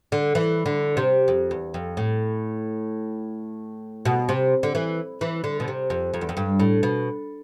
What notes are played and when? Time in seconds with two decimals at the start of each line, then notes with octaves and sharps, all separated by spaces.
0.12 D3
0.35 E3
0.66 D3
0.97 C3
1.28 F2
1.51 E2
1.74 F2
1.97 A2
4.05 B2
4.29 C3
4.63 D3
4.75 E3
5.21 E3
5.44 D3
5.60 B2
5.68 C3
5.90 F2
6.14 F2
6.21 E2
6.29 F2
6.37 G2
6.60 A2
6.83 B2